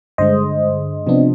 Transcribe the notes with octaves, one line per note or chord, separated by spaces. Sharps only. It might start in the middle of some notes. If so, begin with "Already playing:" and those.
G2 D3 G#3 C5 D#5
C3 F3 B3 D4